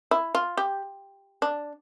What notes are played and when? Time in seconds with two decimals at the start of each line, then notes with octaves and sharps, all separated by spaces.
0.11 E4
0.35 F4
0.57 G4
1.42 D4